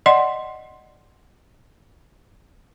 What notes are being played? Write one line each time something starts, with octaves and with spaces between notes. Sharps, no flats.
D5 D#5 F#5 C6